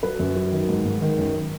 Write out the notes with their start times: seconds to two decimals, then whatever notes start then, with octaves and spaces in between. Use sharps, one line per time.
0.03 F#3 B4
0.20 F#2
0.36 F#3
0.52 D#3
0.69 G#2
0.85 G#2
1.02 D#3
1.18 F#2